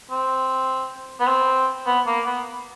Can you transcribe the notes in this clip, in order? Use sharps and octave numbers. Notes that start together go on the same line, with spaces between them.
C4
B3
C4
B3
A#3
B3